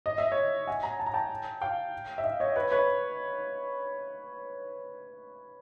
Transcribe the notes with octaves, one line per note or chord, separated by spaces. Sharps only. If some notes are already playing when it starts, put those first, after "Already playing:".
D#5
E5
C#5 D#5
F#5 G#5
G#5 A#5
A5
A#5
G5 A5
F5 G5
E5
D#5 F5
C#5 D#5
B4 C#5
B4 C#5